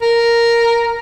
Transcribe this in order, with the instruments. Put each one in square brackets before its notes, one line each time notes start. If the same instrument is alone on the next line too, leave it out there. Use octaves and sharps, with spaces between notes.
[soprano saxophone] A#4